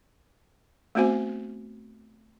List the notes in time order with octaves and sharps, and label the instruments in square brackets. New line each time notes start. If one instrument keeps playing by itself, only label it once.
[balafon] A3 B3 C4 F#4 C5 G#5